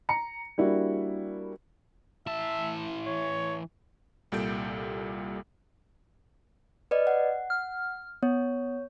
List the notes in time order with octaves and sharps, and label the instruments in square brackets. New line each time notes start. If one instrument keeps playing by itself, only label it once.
[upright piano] A#5 C#7
G3 A#3 D4 E4 F#4
[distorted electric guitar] E3 A5 [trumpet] E5
[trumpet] C#5
[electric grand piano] C2 A#2 G3 A4 G6 D7
[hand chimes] B4 D5 D#5
F#5
[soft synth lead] F6
[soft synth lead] B3 [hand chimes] C#5